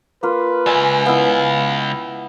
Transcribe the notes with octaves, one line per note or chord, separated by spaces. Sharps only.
A#3 F4 B4
C#2 E5 G#5
B3 E4 F5